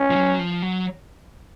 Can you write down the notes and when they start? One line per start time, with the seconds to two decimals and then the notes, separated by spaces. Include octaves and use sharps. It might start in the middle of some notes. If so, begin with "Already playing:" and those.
Already playing: C#4
0.10 F3
0.16 F#3
0.39 F3
0.62 F#3